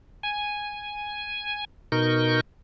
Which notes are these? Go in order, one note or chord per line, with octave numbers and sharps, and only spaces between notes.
G#5
B2 D#4 A#4 C#6 G6